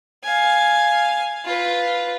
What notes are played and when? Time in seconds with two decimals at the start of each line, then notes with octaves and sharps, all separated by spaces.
0.24 F5 G#5
1.45 F4 B4